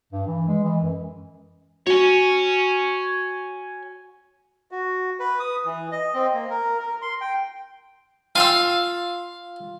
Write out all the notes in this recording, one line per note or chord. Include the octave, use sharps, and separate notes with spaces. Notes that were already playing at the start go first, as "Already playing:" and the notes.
G2
E3
G#3
E3
F#2
F#4 C#5 G#5
F#4
B4
D#6
E3
D#5
C4
A#3
A#4
A#4
C6
G5
F4 F5 E6